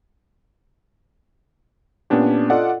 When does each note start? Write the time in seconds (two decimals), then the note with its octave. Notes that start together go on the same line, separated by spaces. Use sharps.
2.10 A#2 B3 C#4 D4 G4
2.50 F4 A4 D5 D#5 F#5